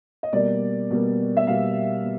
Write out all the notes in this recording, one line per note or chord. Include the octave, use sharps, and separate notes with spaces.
D#5
B2 G3 A#3 D5
B2 G3 A#3
E5
B2 G3 A#3 F5
B2